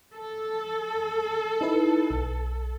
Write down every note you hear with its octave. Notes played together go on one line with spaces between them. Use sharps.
A4
D#4 E4 B4
B1